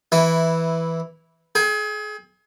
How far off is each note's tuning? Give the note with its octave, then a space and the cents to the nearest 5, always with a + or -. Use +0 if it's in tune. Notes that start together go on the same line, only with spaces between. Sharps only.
E3 +0 E4 -10
G#4 +35 G#5 -40